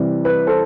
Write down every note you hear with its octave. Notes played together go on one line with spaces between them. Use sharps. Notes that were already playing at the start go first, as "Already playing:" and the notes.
Already playing: C3 E3 G3
B4
A4 C5